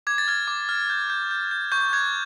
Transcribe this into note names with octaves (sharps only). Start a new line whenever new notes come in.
D6 G#6
A6
F6 G#6
D6
F6
G6
G6
G6
G6
C#6 G6
F#6 G#6